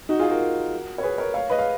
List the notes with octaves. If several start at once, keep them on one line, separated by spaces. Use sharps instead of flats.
D#4 F#4
F4 G#4
F#4 A#4
C#5
G#4 B4
A#4 C#5
C#5 F5
B4 D#5
F5